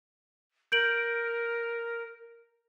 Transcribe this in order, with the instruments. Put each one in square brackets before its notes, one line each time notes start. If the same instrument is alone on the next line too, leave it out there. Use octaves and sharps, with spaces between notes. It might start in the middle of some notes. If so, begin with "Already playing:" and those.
[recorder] A#4 [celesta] G6 D7 F#7